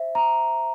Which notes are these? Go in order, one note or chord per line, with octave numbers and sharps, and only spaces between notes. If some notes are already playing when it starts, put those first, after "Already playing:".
Already playing: C5 E5
A#5